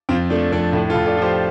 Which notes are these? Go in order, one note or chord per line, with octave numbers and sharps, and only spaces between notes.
F2 C4 F4
F3 A3 D4
F2 A3 D4
A2 A3 D4
F4 A4
A2
A4 D5
F3 G4 C5